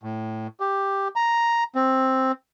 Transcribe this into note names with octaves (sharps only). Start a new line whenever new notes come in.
A2
G4
A#5
C4